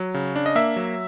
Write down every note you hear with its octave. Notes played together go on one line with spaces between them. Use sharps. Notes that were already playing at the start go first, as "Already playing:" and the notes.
Already playing: F#3
C#3
D4
D#5
A#3 E5
F#3